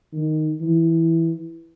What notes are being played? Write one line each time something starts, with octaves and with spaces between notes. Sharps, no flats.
D#3
E3